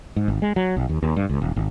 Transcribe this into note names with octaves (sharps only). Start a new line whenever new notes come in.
G#2
G#1
G#3
F#3
B1
D#2
D#2
G2
C#2
D#1
G#1